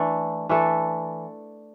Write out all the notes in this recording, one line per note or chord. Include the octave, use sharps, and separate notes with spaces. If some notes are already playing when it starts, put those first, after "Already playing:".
Already playing: E3 A3 D4 A4
E3 A3 D4 A4